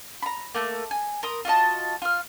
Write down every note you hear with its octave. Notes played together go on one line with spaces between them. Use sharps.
A#5 B5
A3 A#3
G#5
A#4 C6 D#6
F4 F#4 D#5 A5
F4 F6